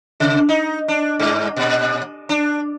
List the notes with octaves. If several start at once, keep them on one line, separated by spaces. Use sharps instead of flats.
C3
D#4
D4
G2
A#2
D4